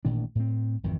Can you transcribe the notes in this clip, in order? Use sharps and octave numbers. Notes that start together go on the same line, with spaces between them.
A1 A#2 D#3 D4
A2 C4
G#1 F2 D#3 E3